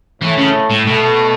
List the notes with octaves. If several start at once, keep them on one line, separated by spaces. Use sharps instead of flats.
A2 E3 A3
C#3
A2
B2 A3 A4